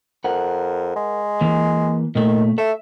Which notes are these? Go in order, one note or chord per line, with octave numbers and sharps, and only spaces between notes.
F2 A#4 F#5
G#3
E3 A#3
A#2 D#3 A3
A3 E5